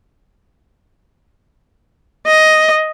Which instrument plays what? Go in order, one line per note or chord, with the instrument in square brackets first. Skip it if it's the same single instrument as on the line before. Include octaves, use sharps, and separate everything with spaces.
[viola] D#5